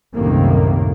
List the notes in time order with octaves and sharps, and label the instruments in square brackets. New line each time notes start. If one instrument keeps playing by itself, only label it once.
[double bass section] C2 F#2 A2 C3 D#3 A#3